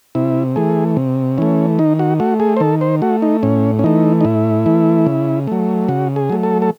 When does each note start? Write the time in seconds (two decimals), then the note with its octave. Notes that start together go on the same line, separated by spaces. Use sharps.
0.15 C3 E4
0.56 E3 A3 G#4
0.97 C3
1.38 E3 A3 C#4
1.79 D#3 D#4
1.99 F#4
2.20 A3 F#4
2.40 G#4
2.57 C5
2.60 D#3 A4
2.81 C5
3.02 A3 F#4
3.22 D#4
3.43 A2 C#4
3.79 C#4
3.84 E3 A3 D#4
4.21 D#4
4.25 A2 E4
4.66 E3 A3
5.07 C#3
5.47 F#3 A3
5.89 C#3 F#4
6.16 G#4
6.30 F#3 A3
6.43 A4
6.62 A4